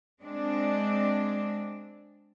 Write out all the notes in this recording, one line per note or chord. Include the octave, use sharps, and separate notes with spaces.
G#3 C4 D4